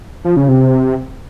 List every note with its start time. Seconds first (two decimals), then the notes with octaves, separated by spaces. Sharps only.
0.25 F3
0.37 C#3
0.48 C3